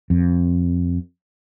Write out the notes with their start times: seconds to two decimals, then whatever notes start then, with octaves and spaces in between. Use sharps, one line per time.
0.10 F2